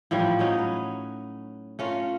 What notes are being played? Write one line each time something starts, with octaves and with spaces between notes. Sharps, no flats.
A2 E3 F3 G3
F#3 C#4 D#4
B4
A3 C#4 F4 A#4